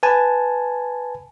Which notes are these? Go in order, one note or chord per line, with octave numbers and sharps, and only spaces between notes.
B4 G#5 A5